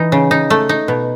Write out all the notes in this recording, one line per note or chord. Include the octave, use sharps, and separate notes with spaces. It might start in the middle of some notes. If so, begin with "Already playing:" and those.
Already playing: E3 D#4
C#3
D#4
A3
D#4
B2